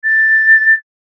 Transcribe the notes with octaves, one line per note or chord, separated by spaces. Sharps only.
A6